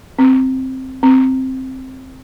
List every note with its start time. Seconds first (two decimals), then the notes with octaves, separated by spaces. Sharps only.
0.19 C4
1.03 C4